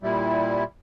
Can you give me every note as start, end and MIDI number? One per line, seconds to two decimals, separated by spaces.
0.03 0.63 46
0.03 0.63 55
0.03 0.63 64